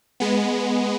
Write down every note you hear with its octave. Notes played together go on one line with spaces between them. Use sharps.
G#3 B3